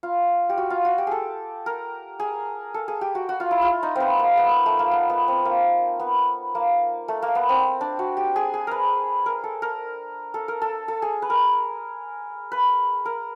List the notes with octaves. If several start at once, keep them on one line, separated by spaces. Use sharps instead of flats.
F4
G4
F#4
F4
F#4
G4
G#4 A4
A#4
G#4
A4
G#4
G4
F#4
F#4
F4
E4
F4
D#4
B3 C4
A#3
B3
A3
A#3
B3
B3
C4
A#3
B3
A#3
A3
A#3
B3
C4
D4
F#4
G4
G#4
G#4
A#4 B4
A#4
A4
A#4
A4
A#4
A4
A4
G#4
B4
A#4
B4
A#4